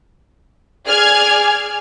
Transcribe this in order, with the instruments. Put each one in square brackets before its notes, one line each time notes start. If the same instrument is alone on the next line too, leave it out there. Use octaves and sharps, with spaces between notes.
[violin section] G#4 D5 G#5 F6 G#6